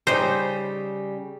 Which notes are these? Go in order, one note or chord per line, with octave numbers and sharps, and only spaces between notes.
C#3 G3 D#4 C5